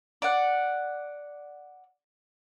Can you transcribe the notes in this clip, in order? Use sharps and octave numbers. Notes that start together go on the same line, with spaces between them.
D5 F#5